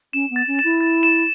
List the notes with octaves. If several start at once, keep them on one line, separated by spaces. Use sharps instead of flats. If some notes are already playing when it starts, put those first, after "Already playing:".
C#4 E7
B3
A6
C#4
E7
E4
A6
E7